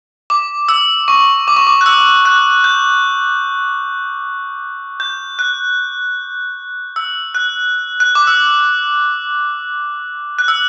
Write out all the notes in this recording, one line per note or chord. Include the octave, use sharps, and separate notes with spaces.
D6
E6
C#6
D6
C#6
D6
F#6
E6
F#6
G6
G6
F#6
E6
F#6
F#6
D6
E6
F#6
E6